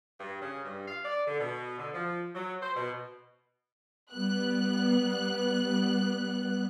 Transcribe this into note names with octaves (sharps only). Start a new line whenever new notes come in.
G2
C#3
G2
F5
D5
D3
B2
D3
F3
F#3
C5
B2
G3 B3 F#6